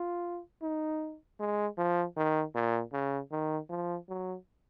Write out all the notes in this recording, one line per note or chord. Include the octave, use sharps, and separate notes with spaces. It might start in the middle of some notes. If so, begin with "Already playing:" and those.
Already playing: F4
D#4
G#3
F3
D#3
A#2
C#3
D#3
F3
F#3